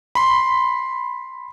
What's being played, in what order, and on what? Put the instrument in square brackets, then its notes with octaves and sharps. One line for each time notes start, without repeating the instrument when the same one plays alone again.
[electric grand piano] B5 C6